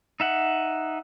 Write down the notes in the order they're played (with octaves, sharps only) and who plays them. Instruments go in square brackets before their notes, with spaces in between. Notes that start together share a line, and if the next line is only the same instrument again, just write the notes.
[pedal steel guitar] D#4 E5 F#5